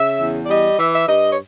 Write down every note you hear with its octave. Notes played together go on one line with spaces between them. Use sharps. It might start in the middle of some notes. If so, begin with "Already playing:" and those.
Already playing: C#3 E5
E2
D5
G3 D#5
E3 E5
E5
G2 D#5
C#5